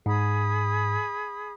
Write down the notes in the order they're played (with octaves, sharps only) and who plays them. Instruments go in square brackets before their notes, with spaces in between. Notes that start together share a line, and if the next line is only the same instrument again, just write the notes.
[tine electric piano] G#2 [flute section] G#4 B5 D#6